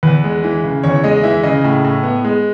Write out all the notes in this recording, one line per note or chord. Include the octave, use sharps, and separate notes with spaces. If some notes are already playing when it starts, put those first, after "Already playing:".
E2 B4
G#3
E3
C#3
E2 C#5
G#3 D#5
E3 E5
C#3 D#5
A2
A2
B3
G#3